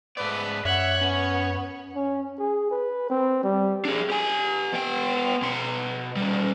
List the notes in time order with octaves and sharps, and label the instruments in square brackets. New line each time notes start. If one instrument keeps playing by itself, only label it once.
[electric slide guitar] G#2 D5 [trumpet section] A3 B3 B4
[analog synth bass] F#2 [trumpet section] C#5 [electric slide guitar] E5 [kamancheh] F#5 F#6
[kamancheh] B3 [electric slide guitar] C#4
[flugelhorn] C#4
G#4
B4
C4
G3
[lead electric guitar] D4 G#4
G4 G#5
B3 G5
B2 C6
A#2 G3